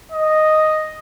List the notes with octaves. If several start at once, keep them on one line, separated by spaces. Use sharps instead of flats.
D#5